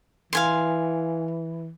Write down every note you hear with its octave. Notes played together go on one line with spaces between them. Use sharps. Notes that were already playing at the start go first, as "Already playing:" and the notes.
E3 F5 G#5 C6